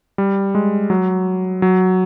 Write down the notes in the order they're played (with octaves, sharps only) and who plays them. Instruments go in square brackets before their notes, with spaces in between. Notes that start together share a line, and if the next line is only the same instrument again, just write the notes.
[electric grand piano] G3
G#3
F#3
F#3